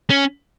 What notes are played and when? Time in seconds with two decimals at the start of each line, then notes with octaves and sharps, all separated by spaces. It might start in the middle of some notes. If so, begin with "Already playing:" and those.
0.10 C#4